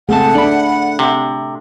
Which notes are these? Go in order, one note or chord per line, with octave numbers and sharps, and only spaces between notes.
C#2 A3 C4 G#4 F#5 A5
D4 D5 B5
C3